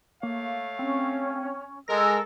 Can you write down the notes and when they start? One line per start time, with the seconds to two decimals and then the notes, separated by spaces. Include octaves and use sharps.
0.23 A3 A#3 C#5 F5
0.79 C4 C#4
1.88 G#3 A4 A#4 E6 A#6